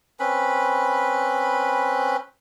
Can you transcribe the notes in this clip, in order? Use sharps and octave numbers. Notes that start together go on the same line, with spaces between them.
C4 C#4 B4 B5